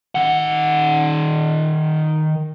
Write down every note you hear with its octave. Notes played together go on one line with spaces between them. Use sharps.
D#3 F#5